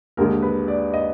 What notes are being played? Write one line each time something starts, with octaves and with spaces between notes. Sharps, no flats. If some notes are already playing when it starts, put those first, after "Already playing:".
D#2 D3 G#3 A#4
B4
D5
D#5